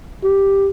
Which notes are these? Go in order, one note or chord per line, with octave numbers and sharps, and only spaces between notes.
G4